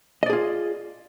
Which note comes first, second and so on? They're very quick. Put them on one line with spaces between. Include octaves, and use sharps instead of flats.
D#5 D5 G#4 F4